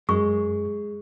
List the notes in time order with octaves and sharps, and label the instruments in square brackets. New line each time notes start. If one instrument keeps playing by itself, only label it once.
[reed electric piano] F#2 [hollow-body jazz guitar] G#3 [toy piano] C#6